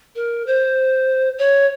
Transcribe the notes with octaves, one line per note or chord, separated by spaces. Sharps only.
A#4
C5
C#5